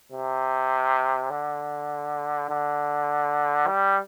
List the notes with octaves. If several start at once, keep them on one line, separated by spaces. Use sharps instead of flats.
C3
D3
D3
G3